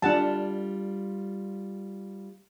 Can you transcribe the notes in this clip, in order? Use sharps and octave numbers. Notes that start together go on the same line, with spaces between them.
G3 D4 F4 F#5 A5